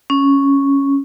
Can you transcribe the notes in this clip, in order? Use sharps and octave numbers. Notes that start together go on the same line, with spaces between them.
C#4